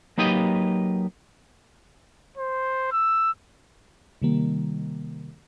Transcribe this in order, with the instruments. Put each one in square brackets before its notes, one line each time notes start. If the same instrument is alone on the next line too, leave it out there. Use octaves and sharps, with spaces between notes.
[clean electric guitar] F#3 A#3 D#4 G4 B4 D#5
[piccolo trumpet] C5
E6
[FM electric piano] C3 D#3 G3 A#3